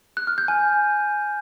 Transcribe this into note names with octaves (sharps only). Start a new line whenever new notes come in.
F#6
F6
G6
G#5